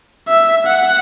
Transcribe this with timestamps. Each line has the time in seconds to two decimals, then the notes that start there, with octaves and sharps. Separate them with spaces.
0.28 E5
0.67 F#5